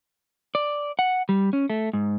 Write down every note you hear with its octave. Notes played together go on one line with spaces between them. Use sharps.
D5
F#5
G3
C#4
A3
G#2